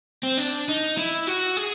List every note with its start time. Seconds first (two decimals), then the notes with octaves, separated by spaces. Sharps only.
0.23 C4
0.38 D4
0.68 D#4
0.98 E4
1.27 F#4
1.57 G#4